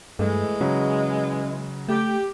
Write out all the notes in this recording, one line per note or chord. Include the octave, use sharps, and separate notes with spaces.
G2 E3 G#3 A3
C#3 F#3 C#4
A3 G4